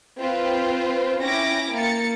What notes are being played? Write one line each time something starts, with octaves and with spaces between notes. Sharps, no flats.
C4 F4 B4 C5
C#4 E4 G5 D6 A#6
A#3 A6 C#7